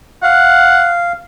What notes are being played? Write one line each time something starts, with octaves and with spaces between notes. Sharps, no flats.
F5 F#5